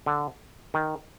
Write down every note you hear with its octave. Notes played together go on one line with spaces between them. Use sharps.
D3
D#3